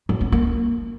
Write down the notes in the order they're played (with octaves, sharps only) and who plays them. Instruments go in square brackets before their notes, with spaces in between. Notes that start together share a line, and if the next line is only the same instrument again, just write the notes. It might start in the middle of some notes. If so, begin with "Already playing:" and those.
[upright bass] F#3
B3
A#3